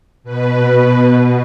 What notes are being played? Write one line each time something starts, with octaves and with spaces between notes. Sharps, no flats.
B2 B4
B2